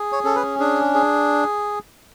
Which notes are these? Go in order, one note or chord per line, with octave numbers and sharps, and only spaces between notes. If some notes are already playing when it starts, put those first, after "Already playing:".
Already playing: G#4
C#5
C#4 A4
B4
D4 G#4
G#4